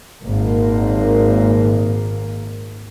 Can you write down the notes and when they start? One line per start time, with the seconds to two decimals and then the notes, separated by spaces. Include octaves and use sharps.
0.22 G#1 A#2 A#3